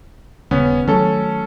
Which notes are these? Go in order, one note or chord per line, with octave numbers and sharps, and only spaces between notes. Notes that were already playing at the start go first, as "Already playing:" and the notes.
D#1 C#3 B3 C#4
D#3 F#3 A3 C#4 A4